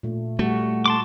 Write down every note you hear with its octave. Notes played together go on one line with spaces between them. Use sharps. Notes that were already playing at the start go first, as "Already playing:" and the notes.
A#2 A3
G3 A3 F#4
A5 C6 D6